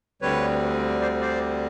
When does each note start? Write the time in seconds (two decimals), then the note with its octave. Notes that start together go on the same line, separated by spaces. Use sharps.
0.22 D2 D3 G3 C4 B4 C#5
1.01 C5 D5
1.21 C5 D5